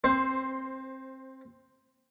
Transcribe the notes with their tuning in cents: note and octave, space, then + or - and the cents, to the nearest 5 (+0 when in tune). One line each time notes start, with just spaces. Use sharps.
C4 +20 C5 +0